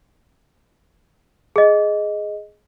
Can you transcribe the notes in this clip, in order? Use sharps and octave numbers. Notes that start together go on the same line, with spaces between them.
G#4 D#5